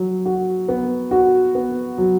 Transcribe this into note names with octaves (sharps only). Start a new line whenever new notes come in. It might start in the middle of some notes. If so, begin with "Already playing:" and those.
Already playing: F#3
F#4
B3
F#4
B3
F#3